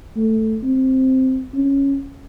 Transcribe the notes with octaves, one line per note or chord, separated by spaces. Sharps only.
A3
C4
C#4